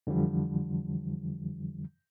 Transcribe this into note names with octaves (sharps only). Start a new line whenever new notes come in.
F2 D3 E3 F3 G3